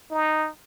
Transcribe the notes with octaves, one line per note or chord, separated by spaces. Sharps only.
D#4